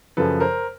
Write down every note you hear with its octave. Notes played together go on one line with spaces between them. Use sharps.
F#2 C#3 F3 A4 B4
A#4 C5